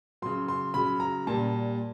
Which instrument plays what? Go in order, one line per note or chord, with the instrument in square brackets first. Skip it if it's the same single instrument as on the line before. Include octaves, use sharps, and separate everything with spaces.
[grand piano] C#3 F#3 C6
C6
C#3 F#3 B5
A#5
A#2 G3 A5